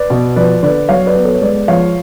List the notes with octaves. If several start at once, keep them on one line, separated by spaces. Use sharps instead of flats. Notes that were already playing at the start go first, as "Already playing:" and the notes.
Already playing: B4 D5
B2
F3 B4 D5
D3 B4 D5
F#3 C#5 F5
B4 D5
B3
A4 C#5
C#5
G#3 B4 D5
F3 C#5 F5